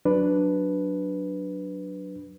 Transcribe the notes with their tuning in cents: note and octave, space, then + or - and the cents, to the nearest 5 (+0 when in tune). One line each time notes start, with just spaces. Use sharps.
F#3 +0 D4 +0 B4 +0